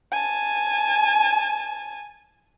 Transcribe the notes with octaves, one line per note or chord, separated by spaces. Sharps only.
G#5 A5